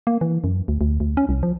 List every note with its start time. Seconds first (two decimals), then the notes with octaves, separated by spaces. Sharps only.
0.07 A#3
0.21 E3
0.44 F#2
0.68 D2
0.81 D2
1.00 D2
1.17 C#4
1.29 C2
1.43 F3